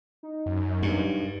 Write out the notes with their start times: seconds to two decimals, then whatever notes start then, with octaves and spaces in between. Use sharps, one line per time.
0.23 D#4
0.46 F#2
0.83 G2